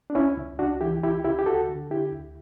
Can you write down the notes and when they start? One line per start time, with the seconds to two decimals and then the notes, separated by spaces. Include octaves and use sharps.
0.10 D4
0.15 C#2 C#4 E4
0.37 C#2
0.59 C#2 D4 F#4
0.81 E3 E4 G4
1.03 C#2 E4 G4
1.24 C#3 E4 G4
1.39 G4
1.46 D2 F#4 A4
1.69 D3
1.90 D3 E4 G4
2.13 D2